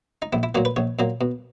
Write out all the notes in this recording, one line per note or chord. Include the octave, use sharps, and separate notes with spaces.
D#4
A#1 E4
E4
A#2 F#3 A#3 F#4
B4
A#1 C#5
A#2 F#3 A#3
B2